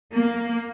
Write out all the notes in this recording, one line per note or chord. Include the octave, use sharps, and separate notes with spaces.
A#3